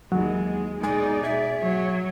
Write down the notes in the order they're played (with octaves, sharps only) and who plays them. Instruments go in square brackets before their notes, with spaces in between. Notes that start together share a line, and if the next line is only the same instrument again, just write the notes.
[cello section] D#2 E3 D#4 [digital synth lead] F#3 [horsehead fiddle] G#3
[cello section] B2 D5 [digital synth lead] G#3 [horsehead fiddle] D#4 [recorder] G#4
[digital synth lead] G#4 [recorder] E5
[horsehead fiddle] F#3 [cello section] C#5